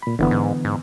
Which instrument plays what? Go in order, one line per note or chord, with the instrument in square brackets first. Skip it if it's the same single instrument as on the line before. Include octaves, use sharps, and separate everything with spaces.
[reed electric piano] A#2 B5
[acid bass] F#1 [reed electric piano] D3 E3 B3
[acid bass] G#2
G#2